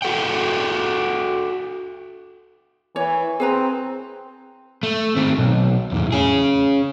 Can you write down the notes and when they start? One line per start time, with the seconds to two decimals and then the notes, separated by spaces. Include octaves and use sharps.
0.02 F#4 A4 F#5 G5
2.96 E3 C#5
3.40 C4 G#4 B4 A#5
4.83 A3
5.16 D#3 C4
5.38 B1
5.92 E2 A2
6.12 C#4 G#4